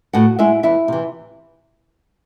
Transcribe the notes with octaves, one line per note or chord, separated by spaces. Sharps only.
A2 F#4 F#5
G#3 E4 E5
E2 E4 E5
C3 E3